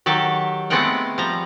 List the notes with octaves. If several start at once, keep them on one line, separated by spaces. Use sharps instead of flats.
D#3 F#3 G4 A4
G#3 A3 B3 C4 F#5 G5
F3 G3 A#5